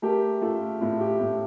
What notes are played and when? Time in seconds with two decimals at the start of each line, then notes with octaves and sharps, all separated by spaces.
0.02 A3 G4 A#4
0.41 A3 F4 A4
0.81 A2 F4
1.00 G4
1.19 A2